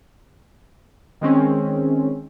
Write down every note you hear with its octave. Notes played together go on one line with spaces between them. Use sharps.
D#3 G#3 C4 C#4